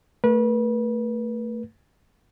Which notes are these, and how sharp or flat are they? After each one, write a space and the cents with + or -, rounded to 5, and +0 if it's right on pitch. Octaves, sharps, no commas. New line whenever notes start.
A3 +20 B4 -30